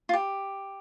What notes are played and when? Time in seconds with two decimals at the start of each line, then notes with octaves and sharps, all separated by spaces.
0.09 F4
0.13 G4